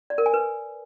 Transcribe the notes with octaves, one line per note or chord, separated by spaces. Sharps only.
D5
A#4
G#5
B4